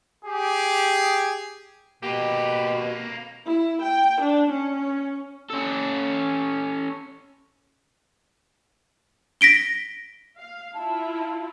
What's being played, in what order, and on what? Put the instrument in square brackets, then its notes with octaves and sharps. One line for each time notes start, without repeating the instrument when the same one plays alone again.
[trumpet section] G4 G#4
[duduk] B2 [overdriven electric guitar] A#3 B4 [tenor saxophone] G4
[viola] E4
G5
D4
C#4
[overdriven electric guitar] C#4 A4
[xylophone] A#6 B6 D7 G7
[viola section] F5
[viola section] E4 F4 [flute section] A5